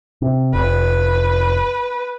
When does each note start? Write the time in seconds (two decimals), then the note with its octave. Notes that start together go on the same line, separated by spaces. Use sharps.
0.22 C3
0.54 F1 B4